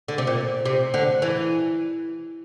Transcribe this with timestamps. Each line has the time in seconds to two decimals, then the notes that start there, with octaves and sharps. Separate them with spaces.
0.08 D3
0.18 C3
0.27 A#2
0.65 C3
0.94 D3
1.22 E3